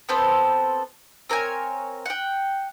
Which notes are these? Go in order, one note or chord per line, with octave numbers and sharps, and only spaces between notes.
B3 C4 A4 C5
C4 A#4 C#5 G#5
F#5 G5